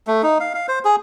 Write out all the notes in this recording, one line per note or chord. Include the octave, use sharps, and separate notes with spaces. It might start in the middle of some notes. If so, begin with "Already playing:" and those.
A3
D#4
F5
F5
C5
G#4